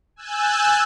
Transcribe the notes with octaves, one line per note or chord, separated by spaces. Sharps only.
G#5 E6 F#6 G6 A6